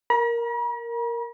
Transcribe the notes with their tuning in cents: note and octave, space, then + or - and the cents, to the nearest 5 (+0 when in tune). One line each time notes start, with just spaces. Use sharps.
A#4 +0 A#5 +45